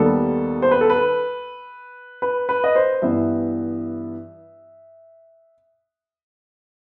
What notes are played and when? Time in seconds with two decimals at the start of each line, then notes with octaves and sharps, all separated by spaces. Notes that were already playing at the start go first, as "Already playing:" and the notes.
Already playing: D#2 D#3 G3 B3 A4
0.62 C5
0.71 B4
0.81 A4
0.90 B4
2.22 B4
2.49 B4
2.64 D#5
2.75 C5
3.02 G2 E3 B3 E5